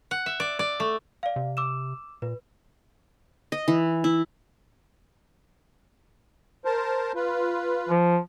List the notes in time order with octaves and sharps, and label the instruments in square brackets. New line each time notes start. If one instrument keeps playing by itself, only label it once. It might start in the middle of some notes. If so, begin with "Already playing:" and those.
[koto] F#5
E5
D5
D5
A3
[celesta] D5 F5
[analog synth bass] C3
[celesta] D6 E6 E7
[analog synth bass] A#2 [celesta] B4
[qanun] D#5
E3
E4
[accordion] A#4 C5 A5
F4 B4
[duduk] F3